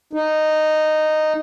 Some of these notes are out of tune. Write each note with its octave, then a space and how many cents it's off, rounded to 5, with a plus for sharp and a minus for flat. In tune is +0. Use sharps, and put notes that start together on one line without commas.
D#4 -10